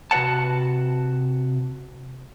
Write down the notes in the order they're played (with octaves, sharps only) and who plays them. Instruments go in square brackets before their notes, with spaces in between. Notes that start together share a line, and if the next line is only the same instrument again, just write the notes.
[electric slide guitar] C3 F#4 B4 C#5 F#5 A5